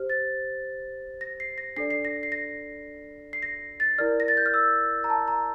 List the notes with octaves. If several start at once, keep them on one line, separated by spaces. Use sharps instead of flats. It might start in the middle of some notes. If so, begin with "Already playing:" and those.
Already playing: G4 C5 F6
A6
A#6
C7
A#6
D4 A4 D5 C7
C7
A#6
C7
A#6
C7
A#6
A6
E4 A#4 D5 F6
A#6
A6
G6
F6
E6
A#5
A5
A#5